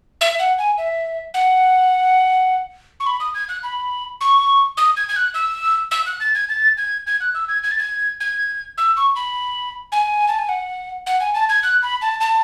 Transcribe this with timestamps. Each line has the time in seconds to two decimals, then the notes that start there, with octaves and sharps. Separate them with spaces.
0.21 E5
0.39 F#5
0.58 G#5
0.78 E5
1.34 F#5
3.00 C#6
3.07 B5
3.20 D#6
3.35 G#6
3.49 F#6
3.63 B5
4.21 C#6
4.77 D#6
4.97 G#6
5.09 G#6
5.16 F#6
5.35 E6
5.91 E6
6.06 F#6
6.20 A6
6.35 G#6
6.49 A6
6.78 G#6
7.07 G#6
7.21 F#6
7.35 E6
7.48 G#6
7.64 G#6
7.71 A6
7.78 G#6
8.20 G#6
8.78 E6
8.97 C#6
9.16 B5
9.92 G#5
10.28 A5
10.39 G#5
10.49 F#5
11.06 F#5
11.21 G#5
11.35 A5
11.49 G#6
11.63 F#6
11.82 B5
12.02 A5
12.21 A5